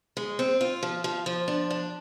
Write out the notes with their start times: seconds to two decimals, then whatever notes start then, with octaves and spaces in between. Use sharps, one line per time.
0.17 G#3
0.39 C4
0.61 F4
0.83 F3
1.04 F3
1.26 F3
1.48 D4
1.70 D4